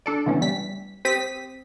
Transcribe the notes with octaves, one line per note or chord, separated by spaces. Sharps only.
D4 A4 D5
D3 E3 A3 B3 C#4
G3 B6
C4 G4 D#6 B6